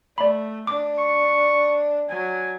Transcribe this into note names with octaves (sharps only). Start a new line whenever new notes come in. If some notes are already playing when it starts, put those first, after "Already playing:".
A3 D5 B5
D4 D6
C#6
F#3 G#5